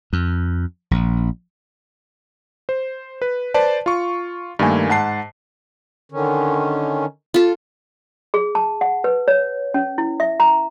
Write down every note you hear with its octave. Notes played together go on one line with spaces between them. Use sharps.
F2
A#1
C5
B4
B4 C5 D5 A5
F4 C#6
G2 D#3 A3 A#3 G#5
G#2 F#5 A5 C7
D3 D#3 C#4
F4 A4
G#4
A5
F#5
B4
C#5
C#4
E4
E5
A#5